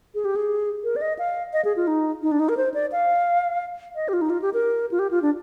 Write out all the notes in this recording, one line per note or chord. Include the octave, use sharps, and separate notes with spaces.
G#4
G4
G#4
A#4
D5
D#5
F5
D#5
G#4
F4
D#4
D#4
D4
D#4
A#4
C5
D5
F5
D#5
G4
F4
D#4
F4
G4
A#4
F4
G4
F4
D4